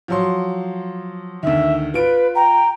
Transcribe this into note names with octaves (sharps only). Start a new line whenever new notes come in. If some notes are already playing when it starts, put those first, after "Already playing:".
F3 F#3 C6
D2 D#3 E5
F4 B4 D7
G5 A#5